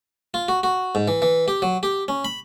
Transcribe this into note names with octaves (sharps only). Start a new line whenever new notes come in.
F4
F#4
F#4
G#2
E3
E3
G4
F#3
G4
C#4
B5